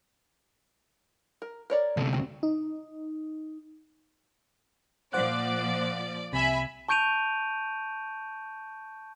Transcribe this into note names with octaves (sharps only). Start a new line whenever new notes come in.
A#4
A#4 C#5 D5
D2 C3 A4
C4 F#4
D#4
A#2 F3 C5 D5 F#5 F#6
C2 C3 E5 G#5 B5
A5 C#6 G6 D7 D#7 F7